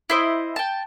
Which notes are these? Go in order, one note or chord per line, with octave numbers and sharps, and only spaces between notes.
E4 C5 D#5
G5 A5